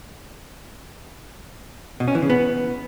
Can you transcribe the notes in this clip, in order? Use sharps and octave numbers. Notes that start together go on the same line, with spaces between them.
B2
C#4
E3
C#3
B3